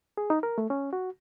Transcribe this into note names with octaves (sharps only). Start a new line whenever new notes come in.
G#4
D#4
A#4
A3
C#4
F#4